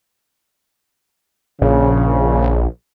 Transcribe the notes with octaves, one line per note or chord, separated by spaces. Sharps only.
A#1 C#3